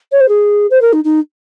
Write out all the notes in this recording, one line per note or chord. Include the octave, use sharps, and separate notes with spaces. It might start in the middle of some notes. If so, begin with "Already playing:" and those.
C#5
C5
G#4
C5
A#4
D#4
D#4